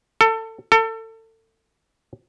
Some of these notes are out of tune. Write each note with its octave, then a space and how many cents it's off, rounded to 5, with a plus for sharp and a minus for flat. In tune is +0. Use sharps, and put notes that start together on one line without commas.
A4 +25
A4 +30